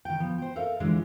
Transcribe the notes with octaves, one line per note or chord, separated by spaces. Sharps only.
D#3 G5
F3 B3
C5 G5
A4 A#4 E5 F5
D3 E3 F3 G#3 D4